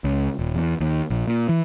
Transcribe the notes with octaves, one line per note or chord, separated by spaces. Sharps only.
C#2
D#1
E2
D#2
A#1
A#2
E3